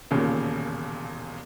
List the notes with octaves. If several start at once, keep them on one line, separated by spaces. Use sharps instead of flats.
E1 D#2 A#2 C#3